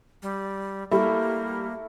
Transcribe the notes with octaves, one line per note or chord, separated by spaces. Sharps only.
G3
G3 A3 A#3 E4 A4